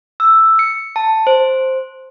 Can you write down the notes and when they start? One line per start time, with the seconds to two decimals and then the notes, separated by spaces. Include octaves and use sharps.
0.20 E6
0.59 C#7
0.96 A5
1.27 C5